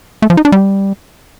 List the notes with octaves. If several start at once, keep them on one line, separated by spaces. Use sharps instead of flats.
A3
F3
D#4
D4
G3